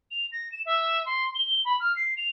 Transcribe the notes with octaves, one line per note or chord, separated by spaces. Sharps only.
F7
A#6
E7
E5
C6
G7
B5
F6
C7
F7